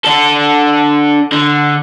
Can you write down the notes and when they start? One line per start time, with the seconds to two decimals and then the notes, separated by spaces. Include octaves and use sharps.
0.05 D4 A4
1.32 D3